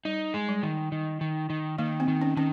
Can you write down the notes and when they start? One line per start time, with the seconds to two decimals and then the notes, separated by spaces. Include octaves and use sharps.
0.05 G3 D#4
0.34 G#3
0.49 G3
0.63 D#3
0.92 D#3
1.21 D#3
1.50 D#3
1.78 D#3 A#3
2.00 C4
2.08 D#3
2.21 C#4
2.37 D#3 C#4